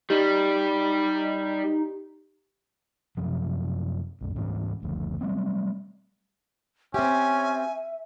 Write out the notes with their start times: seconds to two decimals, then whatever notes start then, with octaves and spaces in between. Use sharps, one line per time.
0.10 G3 D#4 G4
3.17 F#2 C3 F3
4.21 B1 F#2
4.34 D2 G#2 E3 C#4
4.82 F#1 D2 F3
5.21 F#3 G3 A3 C4
6.94 C4 C#4 G4 E5 G#5